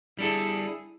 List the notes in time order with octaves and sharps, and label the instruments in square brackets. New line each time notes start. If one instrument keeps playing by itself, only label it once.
[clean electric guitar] G3 D4 A4 [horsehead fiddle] E4 G#4